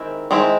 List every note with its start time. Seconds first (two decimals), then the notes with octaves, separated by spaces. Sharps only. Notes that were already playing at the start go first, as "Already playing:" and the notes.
Already playing: D#3 G#3 C4 E4
0.31 D#3 G#3 C4 E4